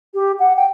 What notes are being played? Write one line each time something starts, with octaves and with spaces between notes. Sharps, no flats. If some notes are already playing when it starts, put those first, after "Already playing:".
G4
F#5
G5